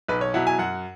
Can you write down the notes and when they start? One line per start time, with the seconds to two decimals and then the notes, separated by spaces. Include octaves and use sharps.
0.08 B1 B4
0.21 C#5
0.34 B2 F#3 E4 F#5
0.47 G#5
0.59 F#2 F#5